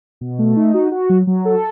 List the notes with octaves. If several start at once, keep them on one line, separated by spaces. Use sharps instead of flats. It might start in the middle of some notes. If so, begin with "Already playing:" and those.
B2
A3
D#4
F#4
F#4
F#3
F#3
A4